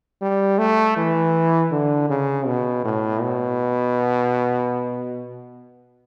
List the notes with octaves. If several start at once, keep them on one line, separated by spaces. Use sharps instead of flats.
G3
A3
E3
D3
C#3
B2
A2
B2